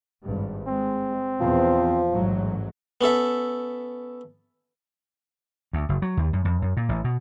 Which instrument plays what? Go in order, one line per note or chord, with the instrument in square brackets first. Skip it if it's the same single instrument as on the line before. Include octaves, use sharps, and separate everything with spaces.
[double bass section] G#1 G2
[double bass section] G#3 [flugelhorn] C4
[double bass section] E2 B2 [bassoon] F3
[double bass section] A1 G#2 F#3
[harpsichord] B3 C#4 A4 E5
[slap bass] D2
F#1
F#3
D#2
F#2
F2
F#2
A#2
A1
B2